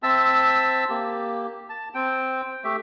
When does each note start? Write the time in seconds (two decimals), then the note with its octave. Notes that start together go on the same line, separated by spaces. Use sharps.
0.03 C4 E5 A5 E6
0.90 A#3 G4
1.69 A5
1.94 C4 G5
2.64 A3 G4 E5